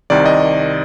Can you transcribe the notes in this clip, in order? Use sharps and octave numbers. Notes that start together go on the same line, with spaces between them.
C2 C3 D#3 D5
D#5